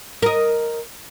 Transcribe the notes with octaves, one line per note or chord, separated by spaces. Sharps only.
A#4 D#5